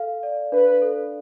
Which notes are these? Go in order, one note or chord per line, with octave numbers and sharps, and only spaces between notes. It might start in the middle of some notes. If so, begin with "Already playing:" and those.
Already playing: A4 F5
D5
D4 B4
A4